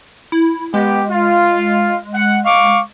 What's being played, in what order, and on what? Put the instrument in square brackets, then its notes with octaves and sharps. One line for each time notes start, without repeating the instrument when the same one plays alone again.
[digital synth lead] E4
[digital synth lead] G#3 [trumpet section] B3 G4
[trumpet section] F4
F#5
F5 C#6 D6